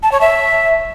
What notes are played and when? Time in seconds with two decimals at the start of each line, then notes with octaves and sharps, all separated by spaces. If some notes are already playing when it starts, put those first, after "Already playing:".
0.03 A5
0.12 C#5
0.21 E5